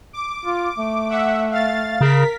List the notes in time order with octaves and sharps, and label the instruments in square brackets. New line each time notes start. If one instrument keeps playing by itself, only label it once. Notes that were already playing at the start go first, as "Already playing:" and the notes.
[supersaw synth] D6
[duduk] F4
A3
[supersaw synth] E5 F#5
F5 A6
[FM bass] C#3 [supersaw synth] A#4 B6